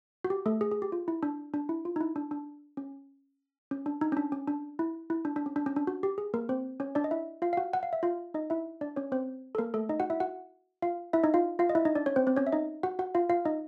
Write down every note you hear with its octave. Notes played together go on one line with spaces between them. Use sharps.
F#4
G4
A3 A4
G#4
G#4
G4
F4
E4
D4
D4
E4
F4
D#4
E4
D4
D4
C#4
C#4
D4
D#4
C#4
D4
C#4
D4
E4
E4
D4
D4
C#4
D4
C#4
D4
F#4
G4
G#4
A#3 A#4
C4 C5
C#4 C#5
D4 D5
D#5
E4 E5
F4 F5
F5
F#4 F#5
F#5
F5
E5
F4 F5
D#4 D#5
E4 E5
D4 D5
C#4 C#5
C4 C5
A4
A#3 A#4
A3 A4
D#4 D#5
F#4 F#5
E4 E5
F#4 F#5
F4 F5
E4 E5
D#4 D#5
F4 F5
F4 F5
D#5
E4 E5
D#4 D#5
D4 D5
C#4 C#5
C4 C5
C4 C5
C#4 C#5
E5
D#4 D#5
F#4 F#5
F#4 F#5
F4 F5
F4 F5
D#4 D#5